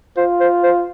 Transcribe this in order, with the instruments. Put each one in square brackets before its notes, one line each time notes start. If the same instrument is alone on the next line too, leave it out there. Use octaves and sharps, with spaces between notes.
[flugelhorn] F4 [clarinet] C5
[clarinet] C5
C5